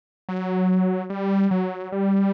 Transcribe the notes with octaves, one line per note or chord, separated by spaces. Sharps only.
F#3
G3
F#3
G3